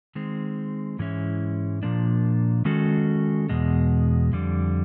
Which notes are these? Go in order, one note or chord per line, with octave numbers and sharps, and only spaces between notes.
D#3 G#3 C4
G#2 E3 G#3 C#4 E4
A#2 F3 A#3 D4
D#3 G#3 C#4 F#4 A4
E2 B2 G#3
F2 D3 G3